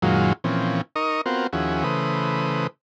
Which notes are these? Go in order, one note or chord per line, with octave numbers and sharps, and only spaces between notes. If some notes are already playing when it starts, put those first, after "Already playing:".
F#2 A#2 D#3 F#3 G#3 F4
A#2 E3 F3 C4 C#4
D#4 A#4 D#5 C#6 D#6
B3 C4 F4 F#4 A#4 C5
D#2 F3 C#4 E4 F#4 G#4
C#3 E3 A3 B4 C5 D#6